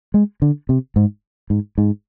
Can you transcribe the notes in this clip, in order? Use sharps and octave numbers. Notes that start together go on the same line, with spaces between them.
G#3
D3
C3
G#2
G#2
G#2